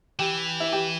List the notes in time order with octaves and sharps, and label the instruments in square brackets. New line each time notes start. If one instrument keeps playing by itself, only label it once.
[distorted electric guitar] E3 [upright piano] G4
[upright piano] E4
G4